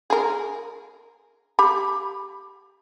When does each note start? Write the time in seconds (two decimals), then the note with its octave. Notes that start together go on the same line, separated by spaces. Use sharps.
0.10 G#4 A#4
1.59 G4 B5